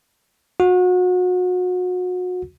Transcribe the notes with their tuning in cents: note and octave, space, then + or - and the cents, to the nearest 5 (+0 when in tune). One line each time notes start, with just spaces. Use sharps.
F#4 -30